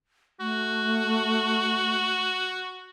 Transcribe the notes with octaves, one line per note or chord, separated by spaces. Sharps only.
A3 F#4